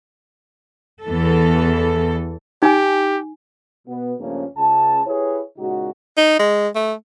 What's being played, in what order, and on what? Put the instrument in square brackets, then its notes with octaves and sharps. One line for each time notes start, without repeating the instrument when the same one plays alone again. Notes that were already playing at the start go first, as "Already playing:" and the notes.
[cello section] E2 E3 A4
[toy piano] D#4 G#5 [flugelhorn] G4
[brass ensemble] B2 B3
G2 C#3 F3 A3 A#3 C#4
C#2 C#3 A5
E4 G4 G#4 B4 C#5
A#2 C#3 G#3 D#4 F#4
[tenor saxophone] D#4
G#3
A3